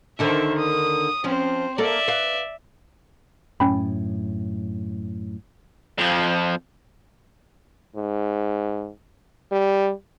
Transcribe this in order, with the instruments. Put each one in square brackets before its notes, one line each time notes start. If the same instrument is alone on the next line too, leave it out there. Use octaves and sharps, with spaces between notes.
[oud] D#2 D3 D#3 [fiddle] C5 E5
[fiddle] D#6
[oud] F3 C#4 [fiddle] C4 C5
[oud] A#3 A4 [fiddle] D5 E5
[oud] B4 F5
[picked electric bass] F#2 A2 [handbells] C#4 G5 B5
[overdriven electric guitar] F2 F3
[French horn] G#2
G3